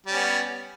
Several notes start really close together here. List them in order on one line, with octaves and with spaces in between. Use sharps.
G3 C#4 B3